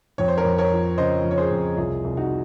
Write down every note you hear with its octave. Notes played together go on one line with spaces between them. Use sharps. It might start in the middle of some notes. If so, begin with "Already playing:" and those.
F2 C#5
C5
A#4 C#5
F2
A#4 C#5
F3
C#3 C5 D#5
F2
C#5
G#4 C5
F2
C2 F4 G#4
C2
D#4 F#4